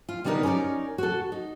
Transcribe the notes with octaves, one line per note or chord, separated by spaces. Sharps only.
F4
D3 G3 B3 D#4 A#4 B4
C#4 D#4 G#4 A#4 D5
F#4 A4
D#4